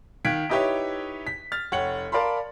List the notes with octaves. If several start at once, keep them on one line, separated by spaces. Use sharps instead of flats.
D#3 F5 F#6 G#6 B6 D7
D#4 E4 G4 B4 C#5 E5
B6
F6 A6
F1 C#5 F#5 G5 C#7 F#7
A#4 D5 F5 A5 B5 C6